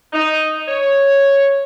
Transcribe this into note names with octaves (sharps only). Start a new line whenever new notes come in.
D#4
C#5